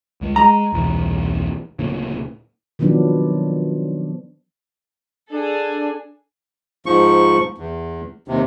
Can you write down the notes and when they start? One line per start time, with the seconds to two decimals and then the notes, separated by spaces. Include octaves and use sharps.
0.21 C#2 G#3
0.36 G#3 A#5
0.72 E1 C2 E3
1.79 D1 A#2 C#3
2.79 D#3 F3 F#3 B3 D4
5.31 D4 G#4 A4
6.86 G#2 F3 C#6
7.58 E2
8.28 D#2 C3